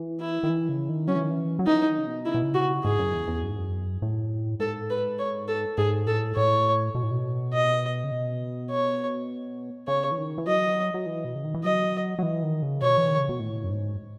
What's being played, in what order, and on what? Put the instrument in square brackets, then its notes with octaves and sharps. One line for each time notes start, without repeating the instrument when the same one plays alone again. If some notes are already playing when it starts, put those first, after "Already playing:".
Already playing: [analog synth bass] E3
[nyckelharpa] E4
[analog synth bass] D#3
E3
C#3
D#3
[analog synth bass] F#3 [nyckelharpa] C#4
[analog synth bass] E3
D#3
E3
F#3
[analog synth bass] E3 [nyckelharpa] D#4
[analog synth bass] D#3
C#3
B2
[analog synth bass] C#3 [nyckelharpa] E4
[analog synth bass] B2
C#3
[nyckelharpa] F#4
[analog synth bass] G#2 [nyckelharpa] G#4
[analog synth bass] F#2
E2
E2
F#2
G#2
F#2
A2
[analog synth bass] G#2 [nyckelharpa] A4
[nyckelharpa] B4
C#5
A4
[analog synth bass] G#2 [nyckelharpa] G#4
[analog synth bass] A2 [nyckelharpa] A4
[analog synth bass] A2 [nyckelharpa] C#5
[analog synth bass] B2
A2
B2
[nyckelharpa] D#5
[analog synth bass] C#3
B2
[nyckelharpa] C#5
[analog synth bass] C#3 [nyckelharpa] C#5
[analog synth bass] E3
D#3
E3
[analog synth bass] F#3 [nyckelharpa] D#5
[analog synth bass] F#3
E3
B2
C#3
D#3
E3
[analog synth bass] F#3 [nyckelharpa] D#5
[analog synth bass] F#3
E3
D#3
C#3
[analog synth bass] B2 [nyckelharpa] C#5
[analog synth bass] E3
D#3
C#3
B2
A2
F#2
G#2